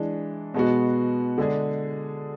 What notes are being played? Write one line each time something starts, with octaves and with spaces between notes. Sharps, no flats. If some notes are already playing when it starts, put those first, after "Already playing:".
Already playing: E3 G#3 D4
B2 G#3 B3 F#4
D3 G#3 D4 G#4